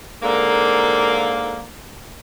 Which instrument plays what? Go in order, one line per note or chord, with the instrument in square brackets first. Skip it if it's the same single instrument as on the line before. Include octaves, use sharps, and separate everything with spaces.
[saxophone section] G#2 D3 A#3